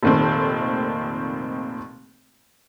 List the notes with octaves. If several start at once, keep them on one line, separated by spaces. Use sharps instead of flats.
F1 A#2 D#3 A3 C4